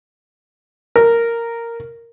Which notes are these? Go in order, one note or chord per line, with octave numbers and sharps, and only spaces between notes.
A#4